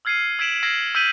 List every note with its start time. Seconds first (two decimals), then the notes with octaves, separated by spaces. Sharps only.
0.05 E6 F6 G#6 C7 C#7 D#7
0.39 E6 G#6 B6 D7 E7 F#7
0.63 E6 F6 G#6 A#6 C7 F#7
0.95 E6 G6 B6 D#7 G7